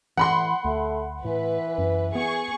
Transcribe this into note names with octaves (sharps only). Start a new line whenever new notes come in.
A2 E3 F#5 B5 C6
D2 A3
A2 E3 B4
F#2
B3 G#4 C#6